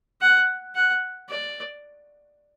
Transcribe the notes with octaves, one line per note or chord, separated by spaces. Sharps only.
F#5
F#5
D5